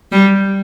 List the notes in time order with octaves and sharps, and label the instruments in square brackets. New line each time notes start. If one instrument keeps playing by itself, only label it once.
[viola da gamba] G3